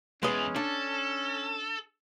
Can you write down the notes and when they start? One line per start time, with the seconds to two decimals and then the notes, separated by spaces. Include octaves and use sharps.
0.23 E2 G#3 C#4 B4 D#5
0.56 D4 A4